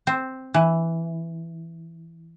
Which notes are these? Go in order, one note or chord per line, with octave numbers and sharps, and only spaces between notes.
C4
E3